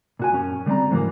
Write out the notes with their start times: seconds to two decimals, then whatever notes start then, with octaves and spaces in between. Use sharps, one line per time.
0.19 A#2 F#4 G#5
0.32 F#2 C#4
0.66 D3 G3 C4 D5 A#5
0.91 F2 G#2 C#3 E3 F#3 A#3